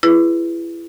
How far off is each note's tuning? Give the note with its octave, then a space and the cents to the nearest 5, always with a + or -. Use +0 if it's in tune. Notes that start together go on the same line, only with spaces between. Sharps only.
E4 +30 G#4 +0 B4 +0